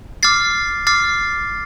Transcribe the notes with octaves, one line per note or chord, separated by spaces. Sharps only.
D6 F6 A6 C7
D6 F6 A6 C7